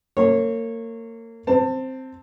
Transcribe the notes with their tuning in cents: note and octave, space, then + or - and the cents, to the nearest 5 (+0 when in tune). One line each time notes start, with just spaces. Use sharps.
A#3 -30 C#5 -15
C4 +0 A5 +25